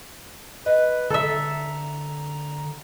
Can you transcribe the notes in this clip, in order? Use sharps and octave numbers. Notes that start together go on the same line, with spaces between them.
B4 D#5
D3 A4 E5 A#5